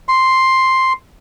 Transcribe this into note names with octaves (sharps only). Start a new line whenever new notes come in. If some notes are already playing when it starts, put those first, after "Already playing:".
C6